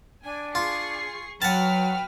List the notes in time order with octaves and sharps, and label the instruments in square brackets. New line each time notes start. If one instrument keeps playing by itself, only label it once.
[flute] D4 [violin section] G#5
[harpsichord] F4 [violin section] G#4 C#6 C7
[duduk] F#3 [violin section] F#4 B4 F6 [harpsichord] F#5 A5 [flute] G5